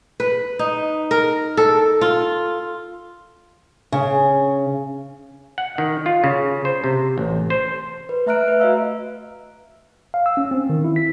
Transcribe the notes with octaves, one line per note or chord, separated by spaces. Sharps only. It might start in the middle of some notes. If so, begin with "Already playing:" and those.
B4
D#4
A#4
A4
F4
C#3
F#5
D#3
F4
C#3
C5
C3
A1
C5
B4
A3 E5 A#5 F6 F#6 D7
B4 E5
F#4 D#5 F5 E6
F5
E6
C#4
C4
D#3
E4
B6